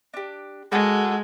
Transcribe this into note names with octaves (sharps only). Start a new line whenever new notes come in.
D4 G4
G#3 F#4 A4 A#4